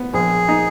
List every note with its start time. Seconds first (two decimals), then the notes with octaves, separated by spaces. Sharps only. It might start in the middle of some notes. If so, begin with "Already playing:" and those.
Already playing: B3
0.14 A#1 G#4
0.49 D#4